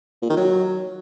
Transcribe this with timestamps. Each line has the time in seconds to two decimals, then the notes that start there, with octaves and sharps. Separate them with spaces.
0.22 A#2
0.30 D#3
0.37 F#3